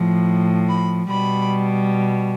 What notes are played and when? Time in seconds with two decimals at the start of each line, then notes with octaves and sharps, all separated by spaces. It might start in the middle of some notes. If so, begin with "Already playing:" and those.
Already playing: A2 F3
0.69 B5
1.09 B2 G3 B5